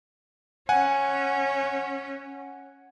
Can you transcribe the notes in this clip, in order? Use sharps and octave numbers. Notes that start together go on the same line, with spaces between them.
C#4 F#5 G#5